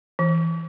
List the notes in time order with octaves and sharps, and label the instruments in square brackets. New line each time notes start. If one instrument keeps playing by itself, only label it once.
[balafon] E3